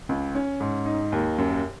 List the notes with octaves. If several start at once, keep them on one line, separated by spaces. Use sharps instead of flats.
C#2
C#4
G#2
D#4
D#2
F#2